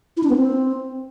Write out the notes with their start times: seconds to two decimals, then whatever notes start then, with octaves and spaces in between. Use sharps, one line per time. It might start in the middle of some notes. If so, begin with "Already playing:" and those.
0.17 E4
0.23 D4
0.30 B3
0.36 C4